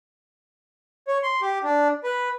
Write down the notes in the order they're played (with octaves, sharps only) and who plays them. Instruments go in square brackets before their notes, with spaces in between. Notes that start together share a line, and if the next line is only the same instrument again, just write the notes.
[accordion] C#5
C6
G4
D4
B4